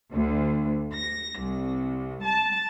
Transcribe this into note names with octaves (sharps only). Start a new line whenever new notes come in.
D2
A#6
C2
A5